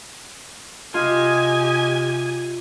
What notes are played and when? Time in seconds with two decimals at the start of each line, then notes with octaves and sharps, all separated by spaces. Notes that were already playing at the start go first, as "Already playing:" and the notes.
0.94 C3 F4 G4 D#5 G#5